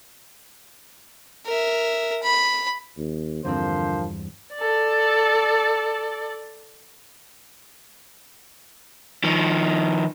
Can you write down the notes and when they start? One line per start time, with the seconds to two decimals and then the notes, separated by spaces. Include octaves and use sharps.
1.46 A#4 E5
2.23 B5
2.97 D#2
3.45 E2 G2 D3 F3 C4 A#4 C5
4.55 A4 D5
9.24 D#3 F3